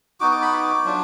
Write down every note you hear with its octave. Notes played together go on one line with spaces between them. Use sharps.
B3 D#4 F#4 D6
D6
B5
D6
F#3 D4 F4